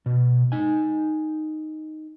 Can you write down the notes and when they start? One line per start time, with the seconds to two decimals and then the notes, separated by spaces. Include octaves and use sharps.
0.06 B2
0.52 D#4 G#5